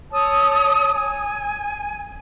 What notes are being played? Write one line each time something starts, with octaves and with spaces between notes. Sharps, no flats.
C#5 A5 D#6 E6
G#5